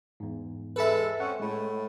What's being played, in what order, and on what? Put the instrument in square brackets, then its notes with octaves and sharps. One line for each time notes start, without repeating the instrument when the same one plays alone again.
[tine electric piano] E2 G#2
[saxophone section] G#3 A4 [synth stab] B4 E5
[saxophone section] C4 C#4 [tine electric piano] F#5
[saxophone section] A2 [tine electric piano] G#3